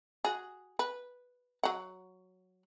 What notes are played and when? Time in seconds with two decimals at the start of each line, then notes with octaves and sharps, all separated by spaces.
0.25 F#4 G#4
0.79 B4
1.63 F#3 F#5